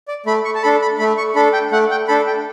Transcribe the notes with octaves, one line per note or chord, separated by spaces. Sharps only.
D5
A3 B5
C#6
A5
D4 A4 B5
B5
A3 B5
C#6
D4 A4 B5
G5
A3 F#5
G5
D4 A4 B5
G5